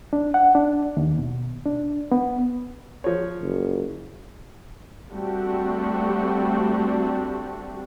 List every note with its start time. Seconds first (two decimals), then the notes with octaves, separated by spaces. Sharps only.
0.13 D4
0.34 F#5
0.55 D4
0.97 D#2
1.18 B2
1.66 D4
2.12 B3
3.04 F3 C#5
3.41 F#1
5.12 G3 A3 C4 D4 F#4 G4